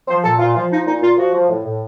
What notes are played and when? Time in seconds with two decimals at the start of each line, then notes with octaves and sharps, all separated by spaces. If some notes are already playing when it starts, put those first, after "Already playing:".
0.08 F3 C5
0.24 A#2 A4
0.40 A#2 F4
0.55 F3 F4
0.71 F3 D#4
0.87 A#2 D#4
1.02 A#2 F4
1.18 F3 F#4
1.34 F3
1.49 A2
1.66 A2